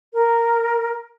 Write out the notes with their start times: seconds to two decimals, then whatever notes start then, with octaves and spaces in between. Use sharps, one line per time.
0.14 A#4